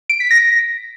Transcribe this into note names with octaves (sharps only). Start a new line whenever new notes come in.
D7
B6
A#6